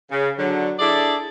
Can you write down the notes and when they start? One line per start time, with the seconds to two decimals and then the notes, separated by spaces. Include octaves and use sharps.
0.10 C#3
0.38 D3 F#3
0.79 D4 E4 G#4 A4 D5